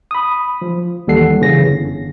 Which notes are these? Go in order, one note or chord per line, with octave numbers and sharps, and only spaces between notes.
B5 D#6
F3
D#2 E3 G3 A4 F#5 C7
F#2 C#3 E3 C#4 A#6
G1